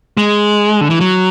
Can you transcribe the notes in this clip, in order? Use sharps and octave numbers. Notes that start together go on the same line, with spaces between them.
G#3
D3
E3
F#3